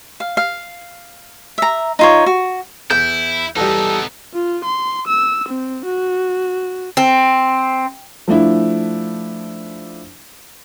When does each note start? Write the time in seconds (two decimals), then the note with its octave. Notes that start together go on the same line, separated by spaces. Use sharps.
0.20 F5
0.37 F5
1.58 E5 A#5
1.99 D#4 F4 C#5
2.26 F#4
2.91 E2 E4 G6
3.56 E2 G3 B3 D#4 A4
4.34 F4
4.65 C6
5.07 E6
5.49 C4
5.85 F#4
6.97 C4
8.28 F3 A3 D4 E4